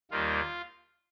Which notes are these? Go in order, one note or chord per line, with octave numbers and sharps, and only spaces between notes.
D#2 D#3 G3 A#3 F4